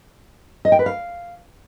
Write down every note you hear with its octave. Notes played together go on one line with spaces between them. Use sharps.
D#5
G5
B4
F5